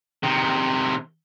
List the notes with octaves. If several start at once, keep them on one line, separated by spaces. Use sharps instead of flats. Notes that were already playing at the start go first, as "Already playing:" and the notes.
C3 D#3